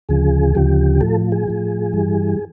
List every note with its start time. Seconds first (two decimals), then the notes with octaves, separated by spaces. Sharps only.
0.09 D2 C#3 F3 G#4
0.55 D2 C#3 F3 G4
1.01 A2 F3 A4
1.32 G#4
1.48 A2 F3
1.93 G2 E3 G3